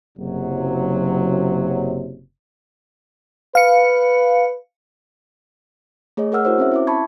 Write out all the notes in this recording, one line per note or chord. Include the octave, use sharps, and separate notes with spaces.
F#1 C3 F#3
B4 F5 C#7
A3 G#4 C#5 D#5
G#4 A#4 F#5 E6 F6
E4 F#4 A#4 C5 C#5
C4 C#4 E5
E4 E5 D6
A5 B5 C#6 G#6